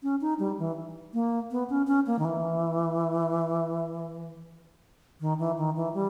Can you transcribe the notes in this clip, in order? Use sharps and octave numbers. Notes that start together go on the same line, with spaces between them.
C#4
D#4
G3
E3
A#3
B3
C#4
C#4
A#3
D#3
E3
D#3
E3
D#3
E3
G3